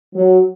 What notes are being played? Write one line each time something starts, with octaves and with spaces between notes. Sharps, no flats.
F#3